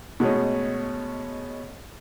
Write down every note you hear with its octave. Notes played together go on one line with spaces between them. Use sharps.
B2 G#3 A3 C#4